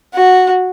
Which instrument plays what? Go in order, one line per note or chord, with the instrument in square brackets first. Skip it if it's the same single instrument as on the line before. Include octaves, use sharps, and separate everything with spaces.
[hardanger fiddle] F#4